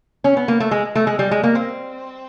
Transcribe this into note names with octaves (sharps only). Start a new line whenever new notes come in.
C#4
B3
A#3
A3
G#3
A3
G#3
G3
G#3
A#3
C4